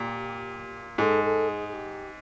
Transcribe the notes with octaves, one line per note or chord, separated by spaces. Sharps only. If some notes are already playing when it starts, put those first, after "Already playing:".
Already playing: A#2 G4
G#2 A4
A4
G#4
G#4
G4